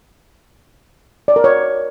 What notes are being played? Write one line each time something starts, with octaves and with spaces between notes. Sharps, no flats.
D5
A#4
C#5